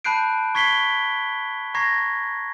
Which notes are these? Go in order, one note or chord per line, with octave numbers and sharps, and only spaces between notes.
A5 B5 F#6 G6 C7 D7
C#6 G#6 B6 C7 G7
A#5 C#6 G#6 A#6 C7